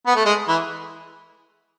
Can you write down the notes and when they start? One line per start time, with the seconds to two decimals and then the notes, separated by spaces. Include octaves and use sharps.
0.07 B3
0.16 A3
0.25 G#3
0.48 E3